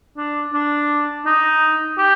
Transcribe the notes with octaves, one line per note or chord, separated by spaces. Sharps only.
D4
D4
D#4
G4